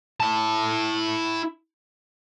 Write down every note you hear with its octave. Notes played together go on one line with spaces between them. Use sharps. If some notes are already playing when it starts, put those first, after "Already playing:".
E4 A5